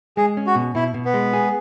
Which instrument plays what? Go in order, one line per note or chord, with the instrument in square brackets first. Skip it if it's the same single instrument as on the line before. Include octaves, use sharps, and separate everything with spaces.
[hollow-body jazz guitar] G#3 [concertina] G#4
[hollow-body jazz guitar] C#4
[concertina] F#4
[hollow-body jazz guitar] B2
[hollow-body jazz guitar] B2 [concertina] E4
[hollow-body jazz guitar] B2
[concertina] B3
[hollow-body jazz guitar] G#3
G#4